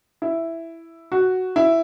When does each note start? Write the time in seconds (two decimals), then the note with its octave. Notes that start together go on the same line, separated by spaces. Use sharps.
0.22 E4
1.12 F#4
1.56 E4